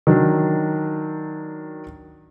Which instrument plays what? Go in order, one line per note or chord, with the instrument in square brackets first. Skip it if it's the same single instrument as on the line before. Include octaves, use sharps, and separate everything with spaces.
[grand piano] D#3 F#3 D4